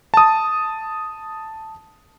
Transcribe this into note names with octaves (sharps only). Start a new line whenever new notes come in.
A5 D#6